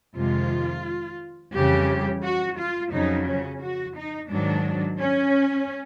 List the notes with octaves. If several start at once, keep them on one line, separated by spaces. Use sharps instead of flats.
F2 C3 D#3 G#3 F4
F2 C#3 E3 G3 G4
F#4
F4
F2 C#3 F#3 D#4
C#4
F#4
D#4
G#2 D#3 F#3 D4
C#4